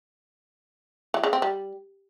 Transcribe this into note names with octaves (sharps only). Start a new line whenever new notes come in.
E3
C#3
C4
G3